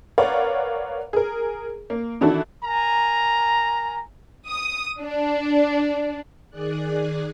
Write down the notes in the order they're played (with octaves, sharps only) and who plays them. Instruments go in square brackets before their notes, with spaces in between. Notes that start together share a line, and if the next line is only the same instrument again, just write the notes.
[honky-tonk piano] A#4 B4 C#5 D5 F5 F#5
G#4 A#4
A#3
D#3 E3 D4 E4 F#4 A4
[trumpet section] A#4 G#5 A#5
[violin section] D#6
D4
[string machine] D#3 G#4 D5 F#6